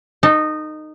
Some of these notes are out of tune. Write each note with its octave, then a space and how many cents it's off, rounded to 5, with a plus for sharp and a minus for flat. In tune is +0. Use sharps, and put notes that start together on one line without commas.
D#4 -15 A4 +20